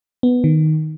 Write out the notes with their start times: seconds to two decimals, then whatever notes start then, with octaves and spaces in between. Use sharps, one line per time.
0.23 B3
0.44 D#3